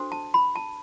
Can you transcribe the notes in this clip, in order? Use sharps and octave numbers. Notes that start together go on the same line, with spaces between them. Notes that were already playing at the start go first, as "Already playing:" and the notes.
Already playing: D4 F#4 A4 C5
A5
B5
A5